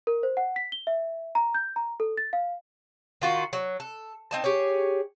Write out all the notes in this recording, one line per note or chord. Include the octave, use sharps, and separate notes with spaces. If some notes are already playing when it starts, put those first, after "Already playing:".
A#4
C5
F#5
B6
G7
E5
A#5
G6
A#5
A4
A6
F5
D#3 F4 F#4
F#3
A4
C4 D#4 A5
G4 G#4 C#5